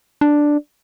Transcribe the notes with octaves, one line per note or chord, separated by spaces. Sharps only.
D4